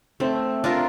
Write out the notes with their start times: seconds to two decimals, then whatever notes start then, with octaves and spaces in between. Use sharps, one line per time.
0.20 A3 C4
0.64 D4 F4 A#4